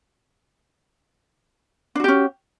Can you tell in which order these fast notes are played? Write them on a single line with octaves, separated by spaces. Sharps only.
D4 F#4 G4 C#4